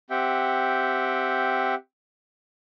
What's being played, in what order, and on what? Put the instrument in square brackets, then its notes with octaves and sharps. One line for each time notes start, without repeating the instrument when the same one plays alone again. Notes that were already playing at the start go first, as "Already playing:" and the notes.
[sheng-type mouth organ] C4 G4 E5 F#5 G5